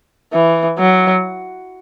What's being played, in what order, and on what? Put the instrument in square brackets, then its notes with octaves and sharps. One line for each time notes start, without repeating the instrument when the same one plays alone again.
[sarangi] E3
F#3